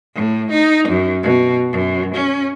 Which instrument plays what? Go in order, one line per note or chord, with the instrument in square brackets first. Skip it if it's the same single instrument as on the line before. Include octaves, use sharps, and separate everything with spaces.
[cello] A2
D#4
F#2
B2
F#2
C#4